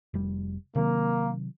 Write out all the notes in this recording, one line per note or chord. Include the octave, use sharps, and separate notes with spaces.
F1 G3
C3 D#3 F#3 A#3